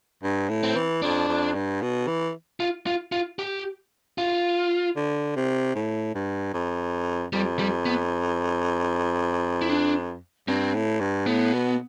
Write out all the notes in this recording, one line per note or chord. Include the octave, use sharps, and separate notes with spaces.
G2
A2
C4
E3
F2 D4
F2
G2
B2
E3
F4
F4
F4
G4
F4
D3
C3
A2
G2
F2
F2 G3
G3
B3
E4
D4
G2 C4
A2
G2
A2 B3
B2